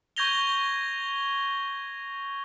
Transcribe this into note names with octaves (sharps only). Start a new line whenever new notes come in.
C#6 G6 G#6 A#6 F7 G7